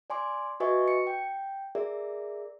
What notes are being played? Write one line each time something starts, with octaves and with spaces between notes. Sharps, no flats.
D5 G#5 C6 D6
F#4 B4 D#5 E5 G#5 C#6
C#7
G5
G#4 A#4 D5 E5